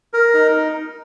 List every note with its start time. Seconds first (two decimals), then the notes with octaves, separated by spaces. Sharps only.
0.13 A#4
0.34 D#4